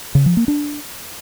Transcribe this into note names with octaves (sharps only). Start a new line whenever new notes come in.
C#3
F3
A#3
D4